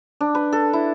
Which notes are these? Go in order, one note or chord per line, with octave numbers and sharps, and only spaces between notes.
D4
B4
A4
E4